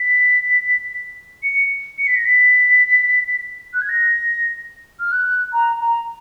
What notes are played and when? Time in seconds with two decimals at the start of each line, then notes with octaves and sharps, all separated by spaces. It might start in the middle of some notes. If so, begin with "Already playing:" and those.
Already playing: B6
1.43 C#7
1.98 C#7
2.07 B6
2.16 A#6
2.25 B6
3.73 F#6
3.81 G#6
3.89 A#6
5.00 F6
5.12 F#6
5.53 A#5
5.80 A#5